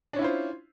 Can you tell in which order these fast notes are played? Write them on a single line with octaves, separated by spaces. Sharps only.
D4 C#4 E4 F4 C5